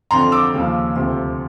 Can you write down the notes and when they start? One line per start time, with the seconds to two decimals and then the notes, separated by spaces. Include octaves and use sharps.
0.11 F2 D3 F3 A#5 C6
0.32 D6 E6
0.54 D#2 C#3 F3
0.96 D2 C3 F3